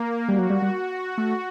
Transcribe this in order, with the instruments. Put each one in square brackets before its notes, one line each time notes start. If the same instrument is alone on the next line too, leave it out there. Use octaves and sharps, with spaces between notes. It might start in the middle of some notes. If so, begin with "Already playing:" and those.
Already playing: [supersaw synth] A#3
[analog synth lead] G3 [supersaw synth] F#4
[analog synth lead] F#3
G3
G3
A3